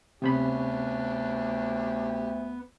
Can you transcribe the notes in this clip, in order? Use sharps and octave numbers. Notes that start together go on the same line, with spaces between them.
D2 C3 B3 C#4 D4 G4 C5 B5